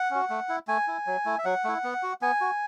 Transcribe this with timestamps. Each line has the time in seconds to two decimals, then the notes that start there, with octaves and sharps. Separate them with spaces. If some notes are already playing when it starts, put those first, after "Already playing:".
Already playing: F#5
0.11 C#4 F#4
0.30 A3
0.49 E4
0.68 A3 G#5
0.88 E4
1.07 F#3
1.25 A3 E4
1.38 E5
1.45 F#3 F#5
1.64 A3 E4
1.84 B3
2.03 F#4
2.22 B3 G#5
2.41 F#4